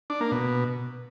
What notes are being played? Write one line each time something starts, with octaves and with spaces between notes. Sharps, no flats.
D4
A#3
B2